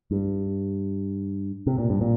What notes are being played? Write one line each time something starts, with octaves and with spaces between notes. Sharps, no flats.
G2
C3
A#2
G2
A#2